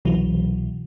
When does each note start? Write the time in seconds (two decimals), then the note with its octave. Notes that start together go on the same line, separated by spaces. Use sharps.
0.05 C2 B2 E3 F#3